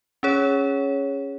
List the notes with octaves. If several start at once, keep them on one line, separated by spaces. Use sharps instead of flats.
C#4 G#4 C#5